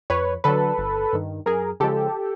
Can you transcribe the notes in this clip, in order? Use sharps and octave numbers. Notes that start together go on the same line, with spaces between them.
F2 B4 C#5
D3 F#3 A4 B4
G1
G2 D#3
F#2 G#4 A#4
C#3 F3 G#3 G4 A4